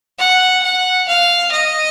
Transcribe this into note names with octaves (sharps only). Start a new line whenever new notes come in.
F#5
F#5
F5
D#5